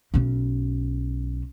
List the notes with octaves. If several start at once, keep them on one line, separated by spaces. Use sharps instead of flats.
B1 C#4